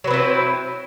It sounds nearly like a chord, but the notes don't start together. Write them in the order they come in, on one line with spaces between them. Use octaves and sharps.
F#3 B4 C4 E4